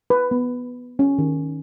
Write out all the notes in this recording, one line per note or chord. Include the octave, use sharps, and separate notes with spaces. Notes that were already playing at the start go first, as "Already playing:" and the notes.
B4
B3
C#4
D#3